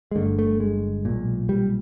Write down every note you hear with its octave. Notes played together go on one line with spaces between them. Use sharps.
G#3
G1 G2 D3 A3
A3
G#3
B1 A#2
G3